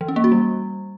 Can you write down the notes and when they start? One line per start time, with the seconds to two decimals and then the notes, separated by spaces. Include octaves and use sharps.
0.01 E3
0.08 C#4
0.16 A#3
0.24 F#4
0.32 G3